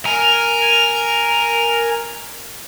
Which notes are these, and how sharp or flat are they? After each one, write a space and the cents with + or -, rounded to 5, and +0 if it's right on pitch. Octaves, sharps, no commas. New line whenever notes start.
A#4 +0 G#5 +0